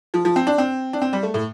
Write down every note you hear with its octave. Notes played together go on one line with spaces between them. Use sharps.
F3
F3
C4
D4
C4
D4
C4
G3
A3
A2